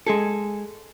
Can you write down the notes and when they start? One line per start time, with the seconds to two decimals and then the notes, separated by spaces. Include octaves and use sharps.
0.07 G#3 G#4 A4